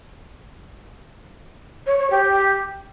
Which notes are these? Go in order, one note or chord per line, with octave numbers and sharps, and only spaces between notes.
C#5
C#5
G4